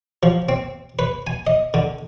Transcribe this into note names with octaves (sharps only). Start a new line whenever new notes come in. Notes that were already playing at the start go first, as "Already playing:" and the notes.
F3
C4
B4
G#5
D#5
D3